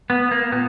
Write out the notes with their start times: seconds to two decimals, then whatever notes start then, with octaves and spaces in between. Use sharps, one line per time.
0.10 B3
0.31 A#3
0.52 A#2 B3